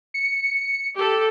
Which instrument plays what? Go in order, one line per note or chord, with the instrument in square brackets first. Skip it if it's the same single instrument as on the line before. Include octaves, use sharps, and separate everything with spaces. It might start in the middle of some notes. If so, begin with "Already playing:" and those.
[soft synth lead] C#7
[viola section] G4 A4